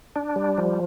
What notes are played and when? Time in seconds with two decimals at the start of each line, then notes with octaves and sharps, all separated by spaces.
0.16 D4
0.36 G3
0.58 F3